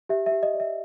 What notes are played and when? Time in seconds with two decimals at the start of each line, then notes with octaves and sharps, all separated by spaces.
0.09 G4 E5
0.26 E5
0.32 G4
0.43 D#5
0.54 D5
0.60 E5